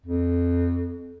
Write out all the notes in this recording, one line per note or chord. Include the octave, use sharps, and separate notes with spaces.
F2